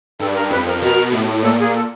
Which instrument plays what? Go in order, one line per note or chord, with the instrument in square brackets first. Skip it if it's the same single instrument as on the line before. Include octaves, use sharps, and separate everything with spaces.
[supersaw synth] G2 [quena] A4
[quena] A#4
[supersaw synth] F2 [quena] B4
[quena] A#4
[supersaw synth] B2 [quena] A#4
[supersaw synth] A2
[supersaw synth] A#2 [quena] A4
[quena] G#4
A4